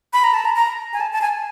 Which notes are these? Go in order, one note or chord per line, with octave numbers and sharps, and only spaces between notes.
B5
A#5
A5
A#5
A#5
G#5
A5
A5
G#5